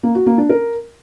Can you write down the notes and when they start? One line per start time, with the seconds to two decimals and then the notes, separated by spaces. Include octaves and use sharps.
0.03 A#3
0.15 F#4
0.26 A#3
0.38 D4
0.49 A#4